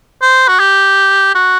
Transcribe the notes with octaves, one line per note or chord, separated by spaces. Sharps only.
C5
F#4
G4
F#4